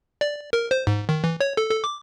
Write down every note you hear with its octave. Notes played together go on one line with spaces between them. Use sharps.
D5
A#4
C5
G#2
D#3
E3
C#5
A4
A4
D6